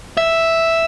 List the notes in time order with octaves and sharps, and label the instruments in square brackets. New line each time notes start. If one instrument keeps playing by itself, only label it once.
[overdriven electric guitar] E5